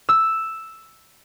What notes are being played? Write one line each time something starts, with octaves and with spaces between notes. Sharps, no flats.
E6